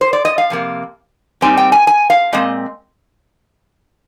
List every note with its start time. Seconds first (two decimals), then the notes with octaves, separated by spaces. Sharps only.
0.01 C5
0.13 D5
0.25 D#5
0.38 F5
0.50 F2 C3 A#3
1.41 A#2 G3 C4 D#4 G#5
1.57 G5
1.72 G#5
1.87 G#5
2.10 F5
2.33 A#2 G#3 C4 D#5